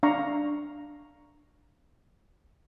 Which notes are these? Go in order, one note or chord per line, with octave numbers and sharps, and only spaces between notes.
D4 F5 A#5 C#6